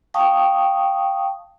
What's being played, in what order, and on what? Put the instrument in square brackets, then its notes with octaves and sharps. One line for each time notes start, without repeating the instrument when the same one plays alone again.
[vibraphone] F5 G5 A5 C#6 D#6